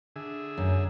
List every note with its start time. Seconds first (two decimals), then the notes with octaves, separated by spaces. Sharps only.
0.16 D3 G#4 E5
0.58 F#2